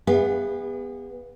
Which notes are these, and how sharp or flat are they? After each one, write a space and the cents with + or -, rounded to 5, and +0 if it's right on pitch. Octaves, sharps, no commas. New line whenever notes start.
B3 -5 G#4 -45 F5 +0